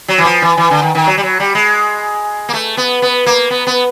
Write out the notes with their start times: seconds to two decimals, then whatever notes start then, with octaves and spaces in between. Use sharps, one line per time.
0.08 F#3
0.18 E3
0.25 F3
0.42 E3
0.57 E3
0.71 D3
0.82 D#3
0.95 D#3
1.07 F#3
1.17 G3
1.23 F#3
1.40 G3
1.55 G#3
2.49 A#3
2.53 A3
2.77 B3
3.02 B3
3.26 A#3
3.50 B3
3.67 B3